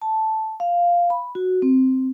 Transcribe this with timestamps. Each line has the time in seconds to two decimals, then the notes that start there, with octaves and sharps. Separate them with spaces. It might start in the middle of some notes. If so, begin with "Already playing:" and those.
0.02 A5
0.60 F5
1.10 B5
1.35 F#4
1.62 C4